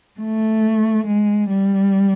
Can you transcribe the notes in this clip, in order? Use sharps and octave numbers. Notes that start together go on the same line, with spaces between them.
A3
G#3
G3